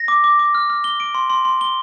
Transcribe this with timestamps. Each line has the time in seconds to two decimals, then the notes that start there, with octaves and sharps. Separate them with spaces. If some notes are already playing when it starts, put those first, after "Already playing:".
Already playing: A#6
0.08 D6
0.24 D6
0.39 D6
0.55 F6
0.70 F6
0.84 G7
1.00 D7
1.15 C6
1.30 C6
1.45 C6
1.61 G7